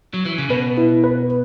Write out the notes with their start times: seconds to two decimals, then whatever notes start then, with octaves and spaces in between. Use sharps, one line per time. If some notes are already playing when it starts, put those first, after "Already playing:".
0.14 F#3
0.25 E3
0.38 C#3
0.49 B2 B4
0.78 E4
1.04 B4